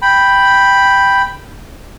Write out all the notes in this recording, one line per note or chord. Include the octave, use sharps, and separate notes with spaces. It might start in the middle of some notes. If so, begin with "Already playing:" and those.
G5 B5